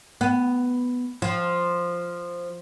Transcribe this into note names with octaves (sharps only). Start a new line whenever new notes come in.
B3
F3